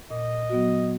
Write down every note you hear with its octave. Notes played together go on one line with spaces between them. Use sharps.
A#2 D#5
F#3 B3 F#4